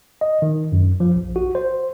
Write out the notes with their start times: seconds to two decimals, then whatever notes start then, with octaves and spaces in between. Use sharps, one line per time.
0.21 D#5
0.42 D#3
0.72 F#2
1.00 F3
1.16 A#1
1.36 F#4
1.55 C5